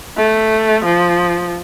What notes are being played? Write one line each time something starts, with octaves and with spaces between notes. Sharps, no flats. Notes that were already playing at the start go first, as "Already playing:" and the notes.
A3
F3